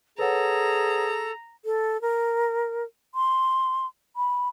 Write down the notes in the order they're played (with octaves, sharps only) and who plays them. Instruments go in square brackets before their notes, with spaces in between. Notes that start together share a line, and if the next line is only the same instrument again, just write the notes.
[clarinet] G#4 [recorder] A4 [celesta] B4 C#5 F#5 [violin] A#5
[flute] A4
A#4
C6
B5